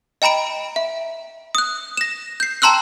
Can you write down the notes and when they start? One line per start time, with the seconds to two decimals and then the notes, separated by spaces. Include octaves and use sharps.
0.22 D#5 G5 A#5 B5 D7
0.76 E5
1.55 D#6 F#6
1.97 A#6 E7
2.40 G6 C7
2.62 G5 A5 A#5 C6 E6 F#6